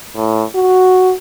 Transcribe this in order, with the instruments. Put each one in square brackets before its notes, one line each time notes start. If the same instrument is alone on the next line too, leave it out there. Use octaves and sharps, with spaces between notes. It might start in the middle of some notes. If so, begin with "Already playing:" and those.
[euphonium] A2
F#4